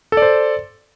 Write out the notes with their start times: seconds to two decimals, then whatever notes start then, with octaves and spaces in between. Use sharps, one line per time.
0.12 A4
0.17 D5
0.22 C5